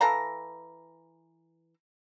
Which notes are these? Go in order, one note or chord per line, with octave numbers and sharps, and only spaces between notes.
E3 A4 F5 A#5